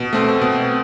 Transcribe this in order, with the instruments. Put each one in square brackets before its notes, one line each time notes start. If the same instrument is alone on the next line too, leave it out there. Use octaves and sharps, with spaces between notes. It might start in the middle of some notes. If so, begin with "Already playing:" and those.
Already playing: [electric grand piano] B2
A3 C4
B2